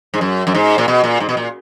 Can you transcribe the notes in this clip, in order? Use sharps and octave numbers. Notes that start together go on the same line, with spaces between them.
G#2
F#2
F#2
G#2
A#2
B2
A#2
G#2
B2
A#2